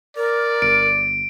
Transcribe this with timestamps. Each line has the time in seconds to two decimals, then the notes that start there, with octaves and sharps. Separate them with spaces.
0.17 A#4 D5
0.62 G1 D7